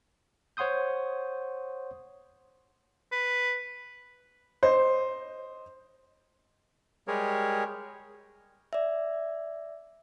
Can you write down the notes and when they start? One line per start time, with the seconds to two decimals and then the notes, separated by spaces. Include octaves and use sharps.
0.57 C5 C#5 F#5 C6 D#6 G6
3.12 B4
4.63 C5 D#5
7.08 G3 G#3 G4 G#4 A#4 C#5
8.73 D5 E5